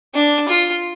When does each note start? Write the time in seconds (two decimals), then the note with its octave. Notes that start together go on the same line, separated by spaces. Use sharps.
0.15 D4
0.48 F4